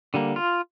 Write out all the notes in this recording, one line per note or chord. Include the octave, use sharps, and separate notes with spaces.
D3 G3 A#3
F4